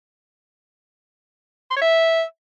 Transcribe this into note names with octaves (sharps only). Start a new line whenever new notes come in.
C6
C#5
E5